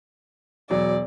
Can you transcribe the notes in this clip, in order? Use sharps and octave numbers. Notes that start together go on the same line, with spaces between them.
E1 F#3 D5